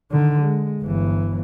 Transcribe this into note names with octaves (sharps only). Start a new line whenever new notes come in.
D3 D#3
G#3
G1 E3